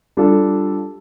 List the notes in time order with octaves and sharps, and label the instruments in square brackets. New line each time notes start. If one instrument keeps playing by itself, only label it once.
[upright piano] G3 D4 F4 A4